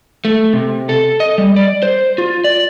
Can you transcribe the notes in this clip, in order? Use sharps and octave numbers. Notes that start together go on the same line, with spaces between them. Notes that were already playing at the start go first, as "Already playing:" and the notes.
A3
C3
A4
D#5
G3
D5
C5
F4
D5